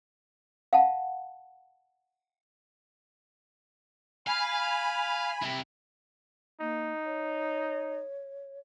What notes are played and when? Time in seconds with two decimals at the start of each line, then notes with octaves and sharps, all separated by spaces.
0.73 F5 F#5 A5
4.27 F5 G#5 B5
5.42 C3 E4
6.60 A#3 D#4
7.05 C#5